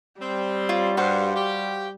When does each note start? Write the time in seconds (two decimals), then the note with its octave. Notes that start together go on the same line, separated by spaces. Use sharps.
0.21 G3 C4
0.69 F4 C#5
0.97 G2 F#4 C5 F5
1.36 G4